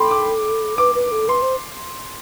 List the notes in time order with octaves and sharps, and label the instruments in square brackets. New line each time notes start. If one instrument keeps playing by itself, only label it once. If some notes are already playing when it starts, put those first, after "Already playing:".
Already playing: [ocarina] A4 [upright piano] G5 B5 C6 D6
[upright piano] D6
[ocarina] B4 [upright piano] D6
[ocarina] B4
A4
[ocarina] B4 [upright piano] C6
[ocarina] C5